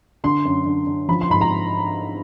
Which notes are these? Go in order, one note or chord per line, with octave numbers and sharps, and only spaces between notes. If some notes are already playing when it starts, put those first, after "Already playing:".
D3 C6
F#2
D3
D3
F3 B5
C6
G#2 B5
A#5